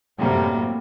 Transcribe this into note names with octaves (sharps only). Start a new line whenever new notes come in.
F#2 A2 C3 F#3 G3 A#3